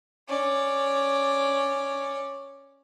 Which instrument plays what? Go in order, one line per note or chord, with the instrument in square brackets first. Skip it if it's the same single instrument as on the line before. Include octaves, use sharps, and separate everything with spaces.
[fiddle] C#4 D5